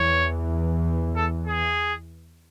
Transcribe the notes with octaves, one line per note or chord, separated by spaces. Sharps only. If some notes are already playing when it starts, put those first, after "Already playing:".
Already playing: E2 E3 C#5
A4
G#4